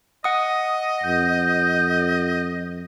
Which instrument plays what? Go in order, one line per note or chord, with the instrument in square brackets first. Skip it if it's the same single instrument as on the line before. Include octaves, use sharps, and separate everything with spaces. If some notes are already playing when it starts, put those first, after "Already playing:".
[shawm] D#5 [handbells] F#5 D#6
[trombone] F2 [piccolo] G6